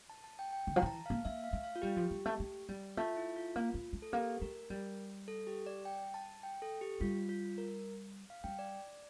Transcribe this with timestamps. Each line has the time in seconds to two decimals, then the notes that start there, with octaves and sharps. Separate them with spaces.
0.10 A5
0.24 A5
0.39 G5
0.53 G5
0.67 D3
0.76 F3 A#5
0.82 E3 A5
1.06 A#3 F5
1.25 A#3 E5
1.44 F5
1.53 A3
1.64 F5
1.76 F4
1.82 G3 G4
1.97 F3
2.11 G3
2.26 A3
2.40 A3
2.69 G3
2.97 A3 F4
3.17 E4
3.36 F4
3.56 A#3
3.74 A#3
3.93 A3
4.02 A4
4.13 A#3 G4
4.41 A3 A#4
4.70 G3
5.28 A4
5.47 G4
5.66 D5
5.85 G5
6.14 A5
6.43 G5
6.62 A4
6.81 G4
7.00 G3 F4
7.29 F4
7.58 A#4
8.30 F5
8.44 G3 G5
8.59 D5